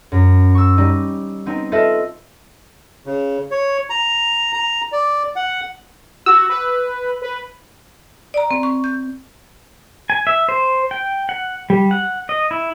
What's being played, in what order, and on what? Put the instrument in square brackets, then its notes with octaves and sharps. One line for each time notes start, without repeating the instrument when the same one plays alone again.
[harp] F#2
C#6 E6
G3 D#4
B3 C4 D#4
F4 A4 B4 C5 D#5 E5
[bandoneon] C#3
C#5
A#5
A#5
D5
F#5
[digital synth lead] F#4 [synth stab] E6
[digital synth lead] B4
B4
[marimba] D5 A#5
C4
C#6
G6
[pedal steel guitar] G#5
E5
C5
G5
F#5
G3
F#5
D#5
E4